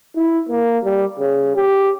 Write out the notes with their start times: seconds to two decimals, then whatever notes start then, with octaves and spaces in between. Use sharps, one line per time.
0.16 E4
0.49 A#3
0.84 G3
1.20 C#3
1.56 G4